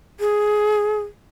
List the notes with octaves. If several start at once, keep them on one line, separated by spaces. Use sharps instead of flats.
G#4